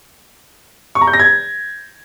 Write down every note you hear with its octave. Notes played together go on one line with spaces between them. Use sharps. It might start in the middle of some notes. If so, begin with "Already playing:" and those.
C#6
A#5
G6
A#6
G#6